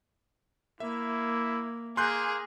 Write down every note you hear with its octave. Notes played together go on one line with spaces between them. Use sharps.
A#3 E4 E5
A#3 G#4 C6 F#6 G6